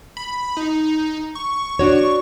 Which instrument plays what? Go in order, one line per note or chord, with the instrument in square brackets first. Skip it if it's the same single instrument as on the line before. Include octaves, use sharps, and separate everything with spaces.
[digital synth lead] B5
D#4
C#6
[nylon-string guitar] D4 F#4 C#5